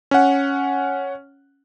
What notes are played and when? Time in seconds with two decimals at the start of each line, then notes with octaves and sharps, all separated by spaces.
0.11 C#4 F#5